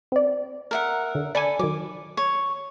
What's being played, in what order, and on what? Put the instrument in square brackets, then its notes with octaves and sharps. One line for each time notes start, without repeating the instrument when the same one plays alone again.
[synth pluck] C4 D5
[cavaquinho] A#4 E5 F#5
[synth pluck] D3
[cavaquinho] A4 B5 [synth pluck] D5 G#5
[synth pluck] D#3 F#3 [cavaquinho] D6
[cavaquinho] C#5